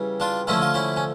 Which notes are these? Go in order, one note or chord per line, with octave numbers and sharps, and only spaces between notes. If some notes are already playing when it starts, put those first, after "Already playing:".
Already playing: C#3 E3 G3
D4 F4
D3 F3 A3 C#4 E4
F4
C#4 E4
C#4